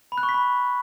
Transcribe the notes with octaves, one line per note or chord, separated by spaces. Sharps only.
B5
F#6
C#6
B6
B5